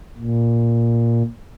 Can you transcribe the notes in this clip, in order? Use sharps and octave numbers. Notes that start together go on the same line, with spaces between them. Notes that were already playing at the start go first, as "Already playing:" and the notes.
A#2